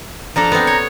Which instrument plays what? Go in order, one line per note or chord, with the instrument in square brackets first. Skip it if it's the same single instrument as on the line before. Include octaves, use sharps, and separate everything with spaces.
[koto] F3 D4 A4 [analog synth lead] A#5
[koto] B3 C4
C#5